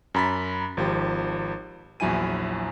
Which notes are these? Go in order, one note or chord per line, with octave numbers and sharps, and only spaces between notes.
F#2 A#5 B5 A6 B6
G#1 F3 G4
A#1 E2 F#3 E4 G#5 D#7